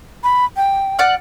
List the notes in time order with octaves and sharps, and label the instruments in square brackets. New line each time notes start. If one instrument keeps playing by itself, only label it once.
[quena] B5
G5
[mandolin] D5 F#5 F6